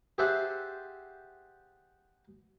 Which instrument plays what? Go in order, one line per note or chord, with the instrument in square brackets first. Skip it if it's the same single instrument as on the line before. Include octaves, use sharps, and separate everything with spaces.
[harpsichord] G4 G#4 C5 E5 F#5 A5